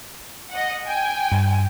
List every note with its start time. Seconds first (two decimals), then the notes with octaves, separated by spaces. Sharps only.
0.51 D#5 F#5
0.85 G5 G#5
1.32 G2